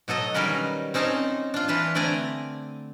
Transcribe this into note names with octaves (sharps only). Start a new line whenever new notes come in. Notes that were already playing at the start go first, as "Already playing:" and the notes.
B2 F#3 A4 D#5
D#3 F#3 G3 C#4 A#4 B4
C4 C#4 D#4 C5 A5 A#5
D4 F4
E3 B4 F5 A5
D3 A3 C4 D5 G#5 A#5